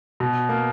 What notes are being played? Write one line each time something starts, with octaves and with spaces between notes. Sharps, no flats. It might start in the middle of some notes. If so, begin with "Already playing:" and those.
B2
A#3